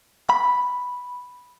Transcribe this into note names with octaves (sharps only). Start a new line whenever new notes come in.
B5